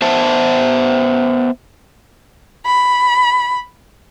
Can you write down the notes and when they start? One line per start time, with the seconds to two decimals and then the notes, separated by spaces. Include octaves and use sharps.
0.02 B3 C5 E5 A5
2.66 B5